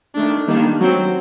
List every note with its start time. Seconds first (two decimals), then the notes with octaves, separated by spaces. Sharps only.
0.16 D#3 A3 D4
0.48 D#3 G3 A#3 D4
0.80 F#3 C4